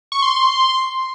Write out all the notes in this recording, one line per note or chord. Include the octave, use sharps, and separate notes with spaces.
C#6
C6